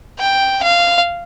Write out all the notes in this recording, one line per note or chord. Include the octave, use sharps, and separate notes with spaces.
G5
F5